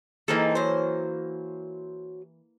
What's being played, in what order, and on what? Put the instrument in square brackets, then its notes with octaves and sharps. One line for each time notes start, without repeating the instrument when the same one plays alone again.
[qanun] E3 A#3 A4 [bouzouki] G#3 C4 D#4
[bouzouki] F#3 C5